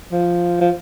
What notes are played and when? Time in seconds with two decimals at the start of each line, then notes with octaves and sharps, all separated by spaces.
0.12 F3
0.61 F3